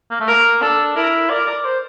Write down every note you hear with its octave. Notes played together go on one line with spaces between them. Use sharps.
A#3
A3
A#3 A#4
D4 A4
E4 A#4
A#4 D5
D5
C5